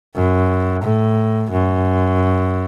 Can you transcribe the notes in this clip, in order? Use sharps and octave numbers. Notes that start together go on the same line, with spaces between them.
F#2
A2
F#2